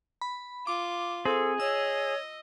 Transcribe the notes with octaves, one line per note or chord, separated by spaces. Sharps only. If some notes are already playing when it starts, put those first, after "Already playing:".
B5
F4 D6
C4 G#4 A4
C#5 D#5 E6